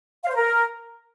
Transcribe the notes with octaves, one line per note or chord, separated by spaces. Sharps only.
F5
C5
A#4